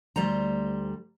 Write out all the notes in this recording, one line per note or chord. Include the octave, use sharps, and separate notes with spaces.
D2 G3 C5 A#5